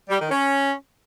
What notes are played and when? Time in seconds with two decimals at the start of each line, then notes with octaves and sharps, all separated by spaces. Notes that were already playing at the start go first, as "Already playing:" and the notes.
0.09 G3
0.20 D#3
0.31 C#4